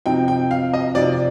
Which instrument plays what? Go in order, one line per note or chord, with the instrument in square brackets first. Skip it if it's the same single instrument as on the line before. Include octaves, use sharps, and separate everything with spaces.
[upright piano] C3 F3 C4 D#4 G5
G5
F5
D#5
C3 F3 C4 D#4 D5